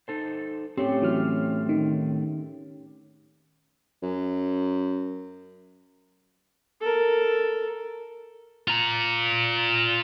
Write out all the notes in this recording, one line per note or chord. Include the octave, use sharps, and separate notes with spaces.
D#4 A4 C5
A2 A3 C4 C#4 G4
E3 F#3 F6
D#3
F#2
A4 A#4
F4 A#5